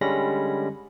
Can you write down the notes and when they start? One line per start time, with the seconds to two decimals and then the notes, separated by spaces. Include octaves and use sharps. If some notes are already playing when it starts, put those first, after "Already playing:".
0.01 D3 G3 G#3 C#4 B5 A#6